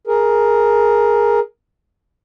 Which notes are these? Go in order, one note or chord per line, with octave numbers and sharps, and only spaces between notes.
G#4 A#4